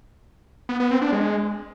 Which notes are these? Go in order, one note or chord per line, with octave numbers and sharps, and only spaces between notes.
B3
B3
C4
D4
G#3